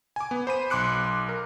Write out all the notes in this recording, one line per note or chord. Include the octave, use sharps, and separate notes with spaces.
G#5 D6
B3
C5 B5 D#7
B1 C6 D6 F#6 C#7
A#4